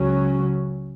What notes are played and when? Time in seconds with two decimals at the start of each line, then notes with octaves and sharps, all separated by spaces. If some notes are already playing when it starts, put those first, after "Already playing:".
Already playing: C#2 C#3 F#3 C#4